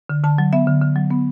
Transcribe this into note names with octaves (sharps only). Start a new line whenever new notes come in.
D3
D3 A5
F#3
B3 E5
D3
D3
F#3
B3